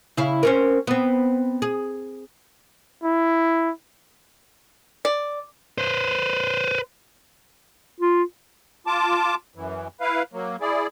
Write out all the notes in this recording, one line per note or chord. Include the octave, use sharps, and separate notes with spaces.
C#3 E4 F5
C4 C#4 A#4
B3 C4
G#4
E4
D5
B4 C5
F4
F4 A5 D6
F#2 E3
E4 B4 F5
F#3 A#3
E4 G#4 D5